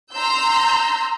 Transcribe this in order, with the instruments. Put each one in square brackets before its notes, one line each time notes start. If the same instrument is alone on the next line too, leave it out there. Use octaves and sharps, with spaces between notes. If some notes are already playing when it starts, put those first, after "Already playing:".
[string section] A#5 C6 E6 G6